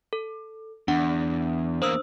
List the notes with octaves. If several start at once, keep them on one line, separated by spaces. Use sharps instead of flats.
A4
E2 D4 F#5
E2 A#3 C5 D#6 E6